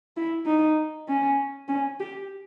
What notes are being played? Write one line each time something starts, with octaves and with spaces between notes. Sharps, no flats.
E4
D#4
C#4
C#4
G4